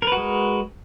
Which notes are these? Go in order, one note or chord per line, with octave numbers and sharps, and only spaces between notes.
G#3 F#4 A#4 B4